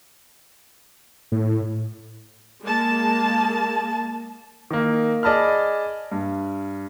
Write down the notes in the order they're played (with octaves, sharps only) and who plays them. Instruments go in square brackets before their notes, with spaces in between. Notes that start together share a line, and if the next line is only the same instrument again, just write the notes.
[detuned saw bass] A2
[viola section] G#3 A#3 A5
[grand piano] D#3 A#3
G#4 D5 D#5 A5 B5 F6
G2